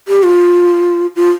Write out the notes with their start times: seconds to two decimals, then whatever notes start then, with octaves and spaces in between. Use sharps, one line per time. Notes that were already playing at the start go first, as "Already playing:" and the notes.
0.08 G4
0.23 F4
1.16 F4